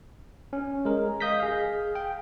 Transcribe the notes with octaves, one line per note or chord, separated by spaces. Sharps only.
C#4
G#3 A#4
D#5 F5 D#6 G6 A#6 B6
G#4 F5
G5